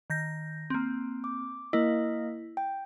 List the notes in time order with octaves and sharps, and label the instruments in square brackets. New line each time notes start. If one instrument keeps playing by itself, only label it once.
[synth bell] D#3 G6 A#6
A#3 C4
[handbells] D6
[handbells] A#3 A#4 D#5 [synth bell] E4
[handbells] G5